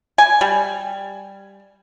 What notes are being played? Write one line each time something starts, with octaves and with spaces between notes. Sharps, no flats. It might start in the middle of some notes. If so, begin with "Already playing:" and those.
G#5
G3